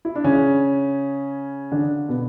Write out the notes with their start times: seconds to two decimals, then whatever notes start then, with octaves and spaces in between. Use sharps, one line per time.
0.05 E4
0.16 D4
0.24 C#3 C#4
1.72 D3 D4
2.08 B2 B3